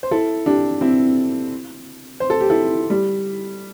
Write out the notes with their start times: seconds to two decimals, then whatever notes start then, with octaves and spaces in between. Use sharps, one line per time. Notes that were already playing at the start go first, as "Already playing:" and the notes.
0.03 C5
0.11 E4 A4
0.46 D4 G4
0.81 C4 E4
2.20 C5
2.30 A4
2.40 G4
2.50 E4 A4
2.90 G3